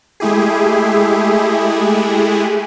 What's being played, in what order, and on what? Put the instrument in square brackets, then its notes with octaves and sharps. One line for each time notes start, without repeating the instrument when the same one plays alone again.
[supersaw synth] G#3 A3 E4 G4 G#4